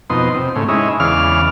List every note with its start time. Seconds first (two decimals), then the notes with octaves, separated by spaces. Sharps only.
0.10 F2 B2 D#4 C6
0.35 C3
0.56 A2 C#3
0.68 G#3 C#4 D#4 E4
1.00 E2 C#3 D5 F5 F6